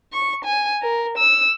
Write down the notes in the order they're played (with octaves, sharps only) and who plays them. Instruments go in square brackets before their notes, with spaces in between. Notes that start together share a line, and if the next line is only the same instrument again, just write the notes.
[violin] C#6
G#5
A#4
E6